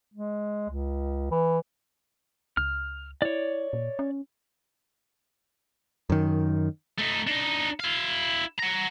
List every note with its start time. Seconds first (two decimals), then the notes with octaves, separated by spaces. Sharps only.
0.14 G#3
0.69 C#2
1.31 E3
2.57 C#2 F6
3.22 E4 C#5 D5
3.73 A#2
3.99 C#4
6.10 F#2 D#3
6.99 A3 D#4
7.27 D4 D#4
7.80 E4 F5
8.58 F#5 A#5